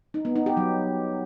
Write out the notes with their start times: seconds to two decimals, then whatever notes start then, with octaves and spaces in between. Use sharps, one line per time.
0.14 D#4
0.25 B3
0.36 D#4
0.46 G4
0.57 F#3